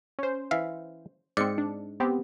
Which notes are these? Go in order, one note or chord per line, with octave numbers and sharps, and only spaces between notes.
C#4 C5
E3 E5 F5
G#2 C4 D5 C#7
D4
B3 C4 G4